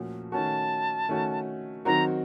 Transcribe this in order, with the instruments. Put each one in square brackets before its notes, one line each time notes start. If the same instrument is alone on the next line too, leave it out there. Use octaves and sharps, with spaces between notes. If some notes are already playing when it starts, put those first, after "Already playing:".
Already playing: [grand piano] A#2 F3 A3 C#4 F#4
[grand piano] D#3 A3 C#4 F#4 [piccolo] A5
[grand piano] D#3 A3 C#4 F#4
[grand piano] D#3 F#3 C4 D#4 F#4 [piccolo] A#5